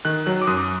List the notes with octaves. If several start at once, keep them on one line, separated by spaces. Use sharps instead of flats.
D#3 F#6
F#3 F#6
D6
F#2 D#6